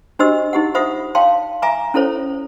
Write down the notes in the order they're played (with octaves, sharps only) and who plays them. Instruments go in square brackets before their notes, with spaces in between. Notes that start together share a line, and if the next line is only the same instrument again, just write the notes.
[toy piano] D4 F#4 G4 C5 D#5 E6
D#4 G4 F#5
F4 C5 E5 F#5 D#6
C#5 F5 G5 A5 C6
E5 G#5 A#5 D6
C#4 E4 A4 C5 C#5